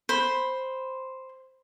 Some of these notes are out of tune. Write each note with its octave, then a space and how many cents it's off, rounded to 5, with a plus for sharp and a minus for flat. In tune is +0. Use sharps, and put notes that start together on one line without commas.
C5 +0 B5 +0